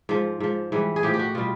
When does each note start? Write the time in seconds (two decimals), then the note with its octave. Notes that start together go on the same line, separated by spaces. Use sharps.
0.09 G#2 F3
0.40 G#2 F3
0.72 G#2 E3 G3
0.96 G#4
1.03 A2 F3 G4
1.14 G4
1.19 F#4
1.35 B2 G3 F4